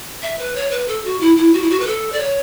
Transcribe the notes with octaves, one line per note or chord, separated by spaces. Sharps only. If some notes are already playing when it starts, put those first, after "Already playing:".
E5
B4
C#5
B4
A4
F#4
E4
E4
F#4
E4
F#4
B4
A4
D5
C#5